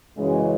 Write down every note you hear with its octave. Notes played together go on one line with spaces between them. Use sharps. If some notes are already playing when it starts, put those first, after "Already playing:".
F#2 C#3 E3 G#3